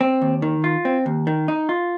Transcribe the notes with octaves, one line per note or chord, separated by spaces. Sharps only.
C4
D#2
D#3
F4
C4
D#2
D#3
D#4
F4